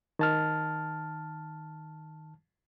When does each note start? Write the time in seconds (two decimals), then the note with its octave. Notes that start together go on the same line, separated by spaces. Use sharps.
0.19 D#3 A5 F6